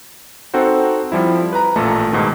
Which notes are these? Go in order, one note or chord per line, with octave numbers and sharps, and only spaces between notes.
C4 D#4 F#4 A4 C5
F3 G3 E4
B4 A#5
A1 A#2 A3 A4 A5
G#2 B2 D#3